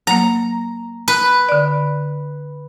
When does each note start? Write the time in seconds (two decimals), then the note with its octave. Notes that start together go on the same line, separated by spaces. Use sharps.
0.07 F#3 A#3 A#5
1.08 B4
1.49 D3 D5